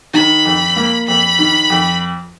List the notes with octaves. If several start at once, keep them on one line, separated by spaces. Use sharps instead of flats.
D#3 B5
F2
A#3
F2 B5
D#3
F2